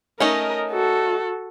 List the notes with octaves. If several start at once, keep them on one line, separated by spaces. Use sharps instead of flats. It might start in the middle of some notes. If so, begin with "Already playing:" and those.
A3 C#4 D#4 A#4 D#5
F#4 A4